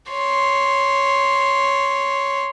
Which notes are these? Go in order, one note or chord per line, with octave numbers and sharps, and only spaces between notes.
C#5 C6